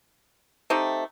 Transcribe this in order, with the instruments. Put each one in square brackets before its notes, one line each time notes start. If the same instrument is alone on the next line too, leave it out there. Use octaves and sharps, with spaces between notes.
[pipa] A3 C4 D#4 G4